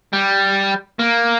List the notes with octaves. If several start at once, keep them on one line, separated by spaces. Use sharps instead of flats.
G3
A#3